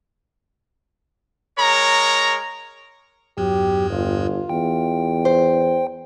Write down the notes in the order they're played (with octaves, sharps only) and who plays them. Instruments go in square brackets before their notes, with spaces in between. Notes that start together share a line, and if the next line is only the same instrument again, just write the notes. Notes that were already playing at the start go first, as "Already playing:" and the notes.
[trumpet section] G#3 A#4 C#5 A#5
[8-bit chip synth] E2 G2 [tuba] F#3 [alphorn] G4
[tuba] G1 [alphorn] F4
[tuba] E2 [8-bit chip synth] G5
[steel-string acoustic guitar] C5